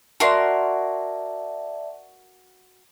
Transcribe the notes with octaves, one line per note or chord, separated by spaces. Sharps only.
F#4 A#4 D5 E5 A5 C6